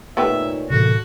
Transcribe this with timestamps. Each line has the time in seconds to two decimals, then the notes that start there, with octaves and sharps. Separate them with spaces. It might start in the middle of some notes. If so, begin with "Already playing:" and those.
0.17 A#2 A3 B3 D#4 G4 C#5 E5
0.70 D2 A2 C3 E3 A#3 F#4 A4